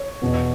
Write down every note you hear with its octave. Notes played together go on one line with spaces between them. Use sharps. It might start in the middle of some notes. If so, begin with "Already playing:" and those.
Already playing: C#5
E2 B2 B3